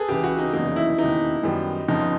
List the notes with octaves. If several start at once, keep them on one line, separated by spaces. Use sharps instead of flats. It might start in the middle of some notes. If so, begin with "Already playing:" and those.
Already playing: G#4 A4 B4
C#2 C#3 E3 G4
F#4
D#4
F1 E2 C#3 F#3 A#3 D#4
E4
E1 D#2 C#3 E3 D#4
F#2 D#3 G3 B3
G1 F2 C#3 F3 D#4